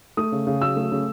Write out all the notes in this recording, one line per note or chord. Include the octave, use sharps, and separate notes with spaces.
A3 D#6
C#3
C#3
F#3 E6
A3
C#3